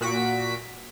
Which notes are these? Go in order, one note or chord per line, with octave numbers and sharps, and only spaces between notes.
A#2 F#4 B6 D7